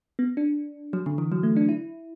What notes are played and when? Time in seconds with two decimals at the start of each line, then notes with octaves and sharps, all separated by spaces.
0.19 B3
0.37 D4
0.93 F#3
1.06 D3
1.18 E3
1.32 F#3
1.43 A3
1.56 D4
1.69 E4